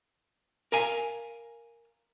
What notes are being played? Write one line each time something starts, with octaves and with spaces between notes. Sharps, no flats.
A#4 F5 G#5